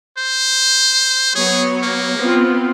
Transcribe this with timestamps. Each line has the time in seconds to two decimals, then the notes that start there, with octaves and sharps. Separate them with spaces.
0.18 C5
1.35 F#3 B3 G#4 C#5
1.83 A#3
2.17 B3 C4 F4